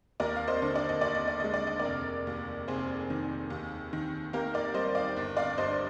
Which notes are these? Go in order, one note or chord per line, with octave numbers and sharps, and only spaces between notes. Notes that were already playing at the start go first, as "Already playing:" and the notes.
D#2 A#4 D5
F5
C5 D#5
D3
D5
D#5
D#2 D5
D#5
D5
G#3 D#5
D5
D#5
A#4 D5
F1
D#2
F1 G#4 C5
D#3
D#2
D#3
A#3 G4 A#4
A#4 D5
G3 C5 D#5
D5 F5
G1
D5 F5
G2 C5 D#5